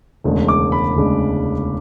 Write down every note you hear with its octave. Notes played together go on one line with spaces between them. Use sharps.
E1 D2 C#3 G#3 D4
D6
B5
E1 D2 C#3 G#3 D4